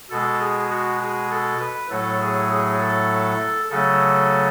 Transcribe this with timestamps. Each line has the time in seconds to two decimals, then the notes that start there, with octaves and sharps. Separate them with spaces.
0.10 B2 G#3 A4
0.39 G#4
0.70 F#4
1.00 G#4
1.30 A4
1.60 B4
1.90 A2 F#3 A3 A4
2.20 G#4
2.50 G#4
2.80 A4
3.70 C#3 F#3 A3 A4